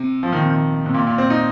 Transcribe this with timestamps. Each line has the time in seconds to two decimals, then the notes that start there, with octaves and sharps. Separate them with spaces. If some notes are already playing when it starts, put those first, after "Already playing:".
Already playing: C3
0.23 F3
0.32 D#3
0.41 C3
0.50 D#3
0.86 C3
0.94 A#2
1.07 A#2
1.18 C4
1.30 D#4